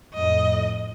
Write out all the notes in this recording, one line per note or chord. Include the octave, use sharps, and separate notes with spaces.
F2 A2 D#5